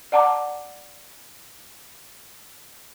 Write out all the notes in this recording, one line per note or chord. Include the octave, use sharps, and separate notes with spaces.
D5 F#5 A5 A#5 D6